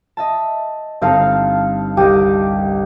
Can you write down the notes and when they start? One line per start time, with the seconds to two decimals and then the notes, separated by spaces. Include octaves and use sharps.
0.17 D#5 E5 A5
1.02 G1 C4 D#4 A4 F5 E6
1.97 C2 G4 D#5